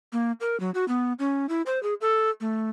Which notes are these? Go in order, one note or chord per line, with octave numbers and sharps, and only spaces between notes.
A#3
A#4
F#3
F#4
B3
C#4
E4
C5
G#4
A4
A3